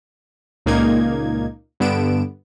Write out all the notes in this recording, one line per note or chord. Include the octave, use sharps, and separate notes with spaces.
C#2 A#2 A#3 D#4 G#6
G2 D3 B3 D7 E7